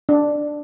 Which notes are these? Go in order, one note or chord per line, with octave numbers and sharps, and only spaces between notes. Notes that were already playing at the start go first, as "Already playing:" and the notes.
D4